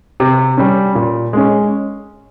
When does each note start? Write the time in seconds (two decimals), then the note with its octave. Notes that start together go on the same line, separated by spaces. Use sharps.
0.20 C3
0.57 G3 C#4
0.95 A#2
1.33 G#3 C#4